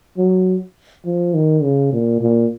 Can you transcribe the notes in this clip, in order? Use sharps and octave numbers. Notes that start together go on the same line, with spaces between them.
F#3
F3
D#3
C#3
A#2
A#2